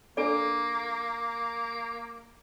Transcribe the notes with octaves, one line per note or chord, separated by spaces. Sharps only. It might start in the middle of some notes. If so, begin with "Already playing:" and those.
A#3 D4 A4 D5